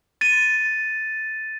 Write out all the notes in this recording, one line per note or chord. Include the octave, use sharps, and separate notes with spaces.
A6 D#7